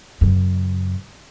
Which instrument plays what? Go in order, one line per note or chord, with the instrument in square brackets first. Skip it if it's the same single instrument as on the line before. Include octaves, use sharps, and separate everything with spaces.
[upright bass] F#2 C#3